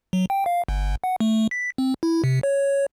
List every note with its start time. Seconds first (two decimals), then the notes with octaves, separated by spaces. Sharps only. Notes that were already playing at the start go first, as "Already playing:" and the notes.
0.13 F#3
0.30 G5
0.46 F5
0.69 G1
1.04 F#5
1.20 A3
1.51 B6
1.78 C4
2.03 E4
2.24 C3
2.43 C#5